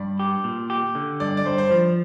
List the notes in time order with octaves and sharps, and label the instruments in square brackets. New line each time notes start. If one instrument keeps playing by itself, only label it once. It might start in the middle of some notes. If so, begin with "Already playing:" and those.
Already playing: [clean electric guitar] G2 [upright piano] D5
[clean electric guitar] G4
A#2
G4
D3
[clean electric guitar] G2 [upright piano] D5
[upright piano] D5
[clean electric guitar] G2 [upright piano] C5
[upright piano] C5
[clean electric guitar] F3